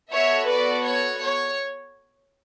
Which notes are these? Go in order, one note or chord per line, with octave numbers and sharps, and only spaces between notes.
B3 F#4 A4 C#5 E5
B4 D5
C#5
C#5